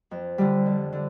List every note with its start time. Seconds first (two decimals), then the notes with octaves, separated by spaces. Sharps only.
0.11 F2
0.38 D3 G3
0.66 F2
0.93 D3